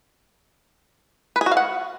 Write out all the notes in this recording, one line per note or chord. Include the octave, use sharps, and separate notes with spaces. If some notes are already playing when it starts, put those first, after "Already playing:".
B4
G#4
F#4
F5
F#5